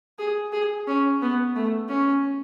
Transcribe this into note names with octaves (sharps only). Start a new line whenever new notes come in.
G#4
G#4
C#4
B3
A3
C#4